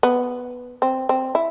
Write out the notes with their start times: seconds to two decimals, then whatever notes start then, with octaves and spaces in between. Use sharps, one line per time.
0.03 B3
0.82 C4
1.09 C4
1.35 E4